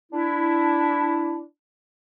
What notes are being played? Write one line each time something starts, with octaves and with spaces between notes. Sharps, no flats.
D4 E4